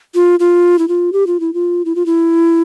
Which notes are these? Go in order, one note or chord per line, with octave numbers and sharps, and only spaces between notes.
F4
F4
E4
F4
G4
F4
E4
F4
E4
F4
E4